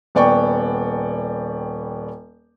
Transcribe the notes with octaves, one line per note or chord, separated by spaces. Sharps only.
D#1 B3 D5 G5 C#6